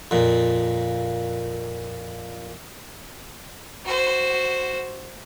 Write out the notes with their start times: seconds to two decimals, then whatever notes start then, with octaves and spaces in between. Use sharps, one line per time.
0.11 F2 A#2
3.85 F#4 C5